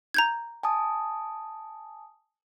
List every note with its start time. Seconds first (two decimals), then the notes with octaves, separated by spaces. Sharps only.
0.14 A#5 G6 G#6
0.63 G#5 A5 D#6